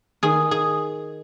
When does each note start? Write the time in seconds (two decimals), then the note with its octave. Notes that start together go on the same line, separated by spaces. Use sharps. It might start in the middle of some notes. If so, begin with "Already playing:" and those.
0.23 D#3 G#4
0.51 G#4